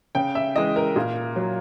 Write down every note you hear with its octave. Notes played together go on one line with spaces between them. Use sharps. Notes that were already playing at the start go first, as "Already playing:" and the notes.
C#3 G5
E5
E3 G#3 D#5
A#4
A#2
F#3